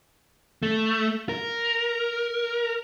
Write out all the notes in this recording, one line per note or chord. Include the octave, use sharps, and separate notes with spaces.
A3
A#4